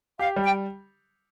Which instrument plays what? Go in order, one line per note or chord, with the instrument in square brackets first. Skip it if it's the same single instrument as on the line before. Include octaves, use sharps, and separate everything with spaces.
[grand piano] G4 [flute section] F5
[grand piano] G3
[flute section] G5